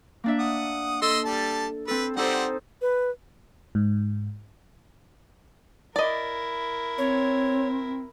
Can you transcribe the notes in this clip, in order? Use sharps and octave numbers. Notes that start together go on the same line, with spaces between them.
A#3 D4 E5
F#5 D#6
A4 D#5 C6 E6
G3 A5
C4 A4 B4
G3 C4 D#4 A4 C5 F#5
B4
G#2
E4 A#4 D5 D#5
C4 C#5